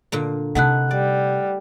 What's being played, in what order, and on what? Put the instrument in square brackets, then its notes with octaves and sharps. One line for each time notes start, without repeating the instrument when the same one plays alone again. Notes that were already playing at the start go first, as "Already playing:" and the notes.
[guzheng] A#2 D3 A#3
[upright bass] C3 [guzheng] A3 D#4 E4 [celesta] F#5 F#6
[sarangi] G3 [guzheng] D5